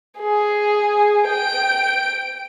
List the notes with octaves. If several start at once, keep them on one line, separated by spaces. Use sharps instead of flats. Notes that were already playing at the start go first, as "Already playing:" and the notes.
G#4
G5 D7